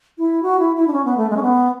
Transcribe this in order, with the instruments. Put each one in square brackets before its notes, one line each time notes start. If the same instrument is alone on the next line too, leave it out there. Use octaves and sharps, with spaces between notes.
[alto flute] E4
F#4
E4
E4
D4
C#4
B3
A3
G#3
C#4
B3